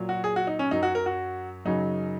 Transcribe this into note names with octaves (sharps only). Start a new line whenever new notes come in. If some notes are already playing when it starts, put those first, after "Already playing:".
Already playing: A#2 F#3
F#4
G#4
F#4
D#4
C#4
F#2 F#3 D#4
F#4
A#4
F#4
F#2 C#3 F#3 D#4